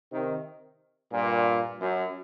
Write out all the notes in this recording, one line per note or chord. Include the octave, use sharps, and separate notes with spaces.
C3 D#3
G2 A#2
F#2